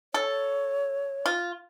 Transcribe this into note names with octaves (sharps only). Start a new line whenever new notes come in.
A4 C#5
F4